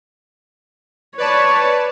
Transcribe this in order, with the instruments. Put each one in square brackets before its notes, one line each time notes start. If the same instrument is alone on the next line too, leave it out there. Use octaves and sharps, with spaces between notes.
[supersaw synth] B4 D5 A5 [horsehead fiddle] C#5